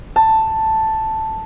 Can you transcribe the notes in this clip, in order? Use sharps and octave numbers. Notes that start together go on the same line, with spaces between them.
A5